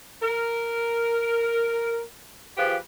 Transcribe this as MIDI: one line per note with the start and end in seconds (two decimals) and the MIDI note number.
0.23 2.02 70
2.58 2.76 53
2.58 2.76 65
2.58 2.76 67
2.58 2.76 68
2.58 2.76 71